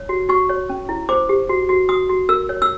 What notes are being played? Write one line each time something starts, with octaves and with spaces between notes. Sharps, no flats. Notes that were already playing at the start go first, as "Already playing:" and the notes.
Already playing: C#5
F#4
F#4 C#6
C#5
C#4
E4
C5 D6
G4
F#4
F#4
F#4 D#6
F#4
A#4 E6
C#5
E6